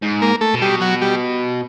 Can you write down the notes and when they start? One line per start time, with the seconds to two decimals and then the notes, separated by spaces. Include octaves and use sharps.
0.02 G#2
0.22 A#3 A#4
0.41 A3 A4
0.54 B2
0.62 G3 G4
0.81 F#3 F#4
1.02 G3 G4